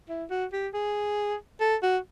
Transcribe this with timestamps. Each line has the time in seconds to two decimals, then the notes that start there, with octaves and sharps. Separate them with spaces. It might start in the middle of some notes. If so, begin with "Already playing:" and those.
0.09 E4
0.30 F#4
0.53 G4
0.74 G#4
1.60 A4
1.83 F#4